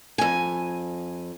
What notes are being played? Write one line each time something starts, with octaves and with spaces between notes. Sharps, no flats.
F2 G#5